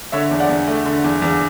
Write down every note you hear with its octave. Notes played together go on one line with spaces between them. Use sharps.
D3 C#5 E5
E2
D5 F#5
E2
A3
D3
E2
E2